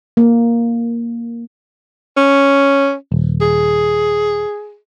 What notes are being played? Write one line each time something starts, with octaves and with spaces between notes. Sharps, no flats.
A#3
C#4
D#1
G#4